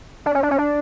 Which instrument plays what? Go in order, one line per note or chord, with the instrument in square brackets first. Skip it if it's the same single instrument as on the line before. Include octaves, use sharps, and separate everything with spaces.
[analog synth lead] D4
C#4
D4
C#4
D4